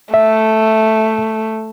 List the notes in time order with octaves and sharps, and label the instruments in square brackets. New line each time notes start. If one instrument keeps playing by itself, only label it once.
[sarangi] A3 [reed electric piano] E5